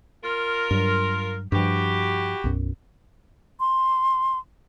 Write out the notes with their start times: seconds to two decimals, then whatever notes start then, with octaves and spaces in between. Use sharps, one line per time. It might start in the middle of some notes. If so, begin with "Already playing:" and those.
0.23 F4 A#4
0.71 G2 F#3
1.52 G2 F3 E4 F#4 G4
2.44 B1 F#2
3.60 C6